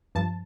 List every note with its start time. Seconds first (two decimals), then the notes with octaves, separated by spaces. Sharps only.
0.15 G2 F3 A5